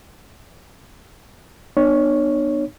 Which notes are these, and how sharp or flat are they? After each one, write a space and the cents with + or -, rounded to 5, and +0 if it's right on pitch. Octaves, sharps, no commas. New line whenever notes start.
B3 +0 D4 +45 C#5 +0